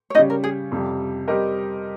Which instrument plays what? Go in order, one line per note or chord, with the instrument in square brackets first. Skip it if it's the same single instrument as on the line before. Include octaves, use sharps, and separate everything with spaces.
[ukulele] C#5
[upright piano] C#3 G3 C#4 [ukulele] D#4 D#5
[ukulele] A#4
G#4
[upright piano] F2 C3 G3
G3 C4 G4 A#4 D#5